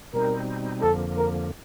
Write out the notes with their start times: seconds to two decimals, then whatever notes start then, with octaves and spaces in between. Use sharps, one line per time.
0.14 B2 G3 C4 D#4 A#4
0.82 F2 D3 F3 A#3 A4
1.17 A#4